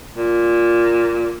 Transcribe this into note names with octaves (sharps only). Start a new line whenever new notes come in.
A#2